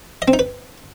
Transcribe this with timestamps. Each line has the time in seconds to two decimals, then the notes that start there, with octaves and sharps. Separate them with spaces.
0.22 D#5
0.28 C4
0.33 D#4
0.39 B4